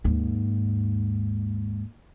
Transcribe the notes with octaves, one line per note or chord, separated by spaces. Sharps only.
D#2 G#2